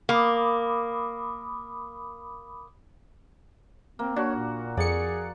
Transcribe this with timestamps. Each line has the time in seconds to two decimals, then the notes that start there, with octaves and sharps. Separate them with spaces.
0.09 A#3 B5 D6 D#6
3.99 A#3 C4
4.16 D4 F#4 C#5
4.35 A#2
4.77 F2 G#4 D5 C#7